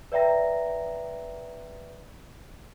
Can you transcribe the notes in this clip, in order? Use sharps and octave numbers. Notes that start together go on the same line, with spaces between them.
B4 D5 E5 G5 A#5 A#6